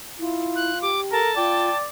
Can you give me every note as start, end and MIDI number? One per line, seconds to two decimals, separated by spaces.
0.19 0.73 64
0.19 0.92 65
0.55 0.79 90
0.82 1.19 67
0.82 1.00 86
1.12 1.35 69
1.12 1.30 70
1.12 1.76 81
1.36 1.69 65
1.36 1.87 74
1.36 1.78 79